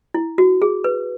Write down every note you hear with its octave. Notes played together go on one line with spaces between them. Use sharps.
E4
F#4
G#4
B4